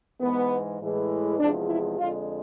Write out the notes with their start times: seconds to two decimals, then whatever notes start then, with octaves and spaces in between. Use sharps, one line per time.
0.21 G#2 E3 G#3 B3
0.80 A2 E3 G#3
1.39 E2 C3 F3 G#3 D4
1.69 E4
1.98 F2 D3 G#3 F4